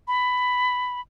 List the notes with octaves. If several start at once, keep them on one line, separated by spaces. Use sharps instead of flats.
B5